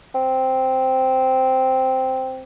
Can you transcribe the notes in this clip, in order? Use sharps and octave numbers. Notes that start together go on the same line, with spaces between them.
C4